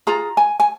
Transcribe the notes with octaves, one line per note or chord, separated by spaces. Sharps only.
F4 G#4 A#5
G#5
G#5